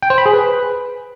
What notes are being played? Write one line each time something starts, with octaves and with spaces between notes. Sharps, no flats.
G5
C5
B5
G#4
B4